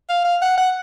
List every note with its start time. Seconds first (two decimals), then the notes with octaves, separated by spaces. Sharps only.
0.10 F5
0.25 F5
0.42 F#5
0.58 F#5